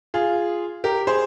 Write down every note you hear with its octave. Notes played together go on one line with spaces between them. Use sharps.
F4 G#4
G4 A#4
G#4 C5